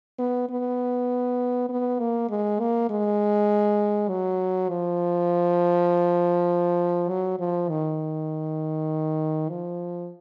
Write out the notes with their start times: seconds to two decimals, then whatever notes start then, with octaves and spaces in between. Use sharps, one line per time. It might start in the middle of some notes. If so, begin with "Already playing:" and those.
0.19 B3
0.49 B3
1.69 B3
2.00 A#3
2.30 G#3
2.60 A#3
2.90 G#3
4.09 F#3
4.69 F3
7.09 F#3
7.40 F3
7.69 D#3
9.49 F3